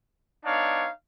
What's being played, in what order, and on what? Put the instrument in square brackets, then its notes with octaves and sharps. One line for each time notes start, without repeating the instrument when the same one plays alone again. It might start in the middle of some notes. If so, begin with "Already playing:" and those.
[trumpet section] B3 D4 D#4 C#5 F5